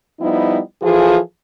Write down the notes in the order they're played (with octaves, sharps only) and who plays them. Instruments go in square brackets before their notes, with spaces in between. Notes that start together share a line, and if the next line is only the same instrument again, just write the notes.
[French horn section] F3 G3 B3 D#4 E4
E3 F3 F4 G#4 A4